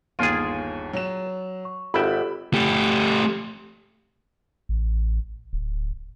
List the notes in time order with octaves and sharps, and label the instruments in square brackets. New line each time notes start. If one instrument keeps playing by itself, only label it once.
[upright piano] G1 D#2 [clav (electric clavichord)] F4 G#4 [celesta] A6 D7 D#7
[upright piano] F#3 E7
[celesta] C#6
[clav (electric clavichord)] G#1 E5 G5 [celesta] F4 G4 A4 [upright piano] B5
[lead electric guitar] A3 G4
[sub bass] A1
D1